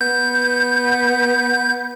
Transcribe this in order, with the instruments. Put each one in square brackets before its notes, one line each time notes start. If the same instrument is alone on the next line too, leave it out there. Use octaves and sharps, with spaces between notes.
[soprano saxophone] B3 [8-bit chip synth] G6